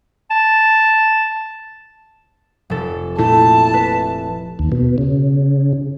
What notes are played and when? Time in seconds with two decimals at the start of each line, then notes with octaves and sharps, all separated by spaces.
0.31 A5
2.70 F1 A4
3.19 A#2 A3 E4 A4 A5
3.74 B4
4.59 D#2
4.72 B2
4.98 C#3